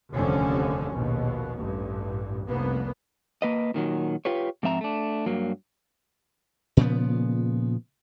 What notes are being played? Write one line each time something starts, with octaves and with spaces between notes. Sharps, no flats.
F1 D#2 D3 F3 C4 C#4
A#1 D#2 B2
A1 G2
F1 C2 A#3 B3
A#3 B4 D#5
A#2 D#3 F#3
F4 G4 B4 C#5
G#2 F3 C4 E5 A#5
A3 D4
G2 F#3 A#3
A#2 C#3 F3 B3